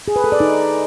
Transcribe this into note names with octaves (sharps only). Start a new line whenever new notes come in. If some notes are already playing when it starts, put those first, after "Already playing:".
G#4
B4
A4
D5
D#4